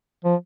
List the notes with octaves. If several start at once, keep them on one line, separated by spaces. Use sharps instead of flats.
F3